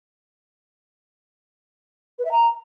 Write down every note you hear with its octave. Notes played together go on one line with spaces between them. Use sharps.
B4
E5
A#5